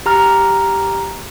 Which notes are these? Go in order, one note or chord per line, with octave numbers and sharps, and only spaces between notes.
G4 A#5 F6